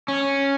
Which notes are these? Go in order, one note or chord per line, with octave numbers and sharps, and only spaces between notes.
C#4